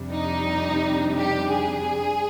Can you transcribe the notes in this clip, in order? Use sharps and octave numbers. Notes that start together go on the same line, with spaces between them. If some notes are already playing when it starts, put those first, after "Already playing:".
Already playing: F2 C3 G3 D4
D#4
G4
G#4